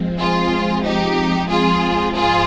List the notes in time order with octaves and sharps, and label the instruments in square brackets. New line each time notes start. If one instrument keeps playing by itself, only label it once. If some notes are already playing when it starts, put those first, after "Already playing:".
Already playing: [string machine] F3 G#3 C4
[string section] F4 G#4
D#4 G4
F4 G#4
[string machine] G#2 F3 [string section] F4 G#4